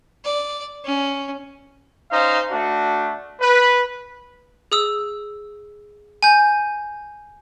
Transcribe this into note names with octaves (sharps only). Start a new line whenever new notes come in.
D5
C#4
C#4 D#4 C5 F5
A3 D4 F#4
B4
G#4 D#6 E6
G#5 G6